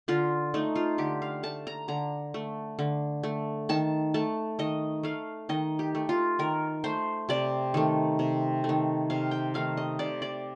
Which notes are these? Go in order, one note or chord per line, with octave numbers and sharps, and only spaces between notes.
D3 F4
A3 D#4
F4
D3 G4
F5
A3 A5
A#5
D3 A#5
A3
D3
A3
D#3 A5
A3 A5
D#3 D#5
A3 F5
D#3 D#5
G4
A3
F4
D#3 A#4
A3 C5
C3 D5
D#3 A3
C3
A3
D#3
C3 F5
G5
D#3 A3 F5
D#5
C3 D5
D5